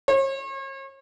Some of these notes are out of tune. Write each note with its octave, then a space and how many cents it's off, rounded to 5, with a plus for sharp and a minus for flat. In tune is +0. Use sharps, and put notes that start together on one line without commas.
C#5 -40